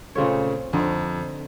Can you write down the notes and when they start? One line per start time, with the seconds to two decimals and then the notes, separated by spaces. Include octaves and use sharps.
0.15 A#2 C#3 A3 C4 F4 C#5
0.73 F2 D3 C4 D#4